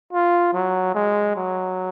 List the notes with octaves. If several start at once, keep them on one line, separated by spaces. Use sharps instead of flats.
F4
F#3
G#3
F#3